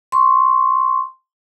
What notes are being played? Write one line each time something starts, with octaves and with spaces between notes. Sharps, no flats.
C6 C#6